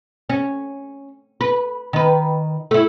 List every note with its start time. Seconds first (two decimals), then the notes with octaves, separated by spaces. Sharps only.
0.30 C#4
1.41 B4
1.93 D#3 B4
2.71 A3 E4